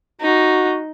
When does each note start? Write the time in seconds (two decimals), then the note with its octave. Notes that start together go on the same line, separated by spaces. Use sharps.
0.21 D#4 F#4